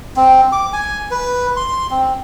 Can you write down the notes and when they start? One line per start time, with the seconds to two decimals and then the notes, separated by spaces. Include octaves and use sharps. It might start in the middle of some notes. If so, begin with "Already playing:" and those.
0.16 C4
0.52 D6
0.73 G#5
1.11 B4
1.56 C6
1.91 C4